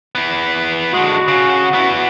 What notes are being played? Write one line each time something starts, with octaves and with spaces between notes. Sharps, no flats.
B3 E4
D3 G#3 F#4
C#3
B3 E4